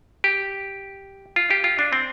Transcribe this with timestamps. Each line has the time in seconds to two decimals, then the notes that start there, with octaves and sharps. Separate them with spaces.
0.24 G4
1.36 F4
1.51 G4
1.64 F4
1.79 D4
1.93 C4